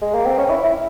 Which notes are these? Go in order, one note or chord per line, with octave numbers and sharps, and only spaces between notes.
G#3
A#3
C4
C#4
E4
E4